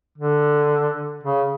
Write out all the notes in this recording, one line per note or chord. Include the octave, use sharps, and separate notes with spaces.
D3
C#3